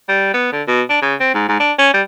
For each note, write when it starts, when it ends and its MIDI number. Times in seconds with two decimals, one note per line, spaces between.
0.09 0.33 55
0.34 0.50 59
0.53 0.62 50
0.68 0.82 47
0.90 1.01 62
1.02 1.15 49
1.21 1.33 60
1.34 1.48 44
1.48 1.57 44
1.60 1.73 62
1.78 1.90 61
1.94 2.02 55